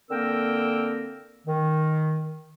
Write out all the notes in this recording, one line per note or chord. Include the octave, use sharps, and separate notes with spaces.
D3 A#3 C4 A#4 G5 E6
D#3